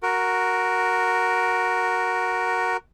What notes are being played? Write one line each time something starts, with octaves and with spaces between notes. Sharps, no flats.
F#4 A#4